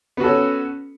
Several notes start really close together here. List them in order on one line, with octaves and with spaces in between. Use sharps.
B3 F#4 A4 C#4